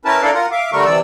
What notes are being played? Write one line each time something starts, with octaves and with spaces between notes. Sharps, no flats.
C#4 E4 A#4 B4 A5
D4 E4 A4 A#4 D5 F5
F4 A#4 F#5
E5 F5 D6
D3 G3 A3 A#4 C#6
C3 E3 D5 E6